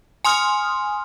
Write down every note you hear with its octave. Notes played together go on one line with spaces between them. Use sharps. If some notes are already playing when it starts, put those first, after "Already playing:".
G#5 C6 D#6 F6